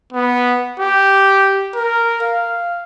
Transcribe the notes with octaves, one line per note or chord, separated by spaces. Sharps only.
B3
G4
A#4
F5